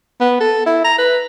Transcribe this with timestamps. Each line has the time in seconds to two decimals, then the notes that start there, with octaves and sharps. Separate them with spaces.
0.20 B3
0.40 A4
0.66 E4
0.84 A#5
0.98 B4